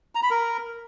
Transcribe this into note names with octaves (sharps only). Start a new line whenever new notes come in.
A#5
B5
A#4